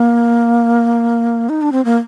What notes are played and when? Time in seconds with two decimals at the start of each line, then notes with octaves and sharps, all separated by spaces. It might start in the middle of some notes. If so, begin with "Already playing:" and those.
Already playing: A#3
1.49 D#4
1.62 D4
1.72 C4
1.85 A#3